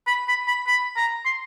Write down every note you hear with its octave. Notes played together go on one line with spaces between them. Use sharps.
B5
B5
B5
B5
A#5
C6